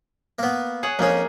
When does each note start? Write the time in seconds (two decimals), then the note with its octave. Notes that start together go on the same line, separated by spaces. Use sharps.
0.39 A#3 B3
0.83 G#4 C#5 F#5
0.99 F2 A#3 C#4 D#4 G#4